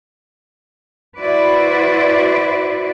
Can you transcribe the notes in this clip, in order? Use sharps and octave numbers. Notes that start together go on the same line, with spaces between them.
E4 F#4 B4 C5 D5